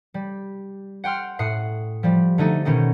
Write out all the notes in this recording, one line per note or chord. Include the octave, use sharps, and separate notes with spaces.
G3
F#5 G5 C6 F6
A2 F#5 D#6 C7 C#7
F3 G3
D3 A3 D#4
B2 D#3 C#4 D#4